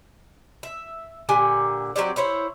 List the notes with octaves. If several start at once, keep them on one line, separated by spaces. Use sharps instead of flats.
E5
A#2 D3 G4 G#5
F#3 C4 G4 D5
E4 C5 C#5